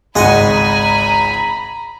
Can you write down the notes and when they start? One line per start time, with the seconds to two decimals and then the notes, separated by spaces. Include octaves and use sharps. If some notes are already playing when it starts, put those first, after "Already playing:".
0.16 G#1 C#2 G#3 D#5 F#5 G#5 A#5 B5